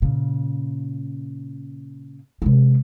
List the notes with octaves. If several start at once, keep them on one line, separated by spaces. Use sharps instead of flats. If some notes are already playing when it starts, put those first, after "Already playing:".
A#2 C#3
C3 G#3